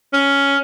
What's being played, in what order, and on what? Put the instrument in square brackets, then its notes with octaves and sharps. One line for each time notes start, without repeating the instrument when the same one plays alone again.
[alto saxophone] C#4